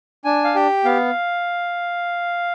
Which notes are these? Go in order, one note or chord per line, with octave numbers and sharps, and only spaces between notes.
D4 G#5
F5
G4 G5
B3 F5